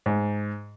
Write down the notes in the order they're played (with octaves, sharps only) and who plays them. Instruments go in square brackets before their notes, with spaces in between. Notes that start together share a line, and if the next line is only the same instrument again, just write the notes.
[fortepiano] G#2